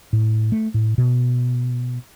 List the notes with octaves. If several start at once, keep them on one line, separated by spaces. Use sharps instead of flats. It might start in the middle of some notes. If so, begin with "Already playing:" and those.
A2
A3
A2
B2